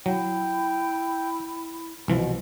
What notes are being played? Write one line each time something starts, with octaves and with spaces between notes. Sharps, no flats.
F#3 E4 G5
C2 B2 E3 F3